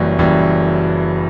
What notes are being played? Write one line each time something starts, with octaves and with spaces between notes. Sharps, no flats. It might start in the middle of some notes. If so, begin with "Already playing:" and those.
Already playing: F#1 F#2 E3 G3
F#1 F#2 E3 G3